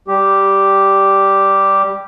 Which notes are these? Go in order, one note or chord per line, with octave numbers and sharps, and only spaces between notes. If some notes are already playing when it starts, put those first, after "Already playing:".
G3 G4